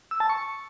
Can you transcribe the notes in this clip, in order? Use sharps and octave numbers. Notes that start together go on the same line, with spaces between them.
E6
A5
C#6